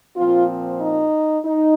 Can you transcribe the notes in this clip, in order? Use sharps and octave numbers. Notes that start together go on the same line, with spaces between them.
A#2 F3 C4 F4
D#4
D#4